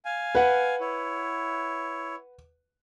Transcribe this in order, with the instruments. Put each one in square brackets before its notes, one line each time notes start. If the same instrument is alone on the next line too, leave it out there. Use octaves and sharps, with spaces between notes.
[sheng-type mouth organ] F5 G#5
[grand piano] B4 F#5
[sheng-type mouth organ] E4 C#5